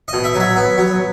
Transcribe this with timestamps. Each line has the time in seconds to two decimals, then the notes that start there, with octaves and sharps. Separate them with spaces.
0.08 D#5
0.13 B2
0.24 E5
0.35 F#3
0.40 E5
0.56 B3
0.78 F#3